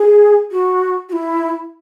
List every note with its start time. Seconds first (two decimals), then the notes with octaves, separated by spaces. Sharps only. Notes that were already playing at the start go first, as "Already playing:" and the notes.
Already playing: G#4
0.52 F#4
1.09 F#4
1.12 E4